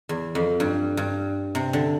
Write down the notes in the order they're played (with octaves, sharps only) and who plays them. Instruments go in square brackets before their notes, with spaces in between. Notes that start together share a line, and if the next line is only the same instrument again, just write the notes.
[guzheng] E2
F2
G2
G2
C3
D3